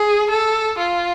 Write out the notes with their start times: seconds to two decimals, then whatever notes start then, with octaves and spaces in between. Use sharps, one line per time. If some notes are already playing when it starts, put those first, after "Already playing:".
Already playing: G#4
0.30 A4
0.78 F4